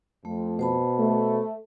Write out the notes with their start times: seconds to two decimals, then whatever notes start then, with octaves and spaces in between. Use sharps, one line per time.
0.25 F2 A3
0.59 B2 C5 A5 B5
0.98 A3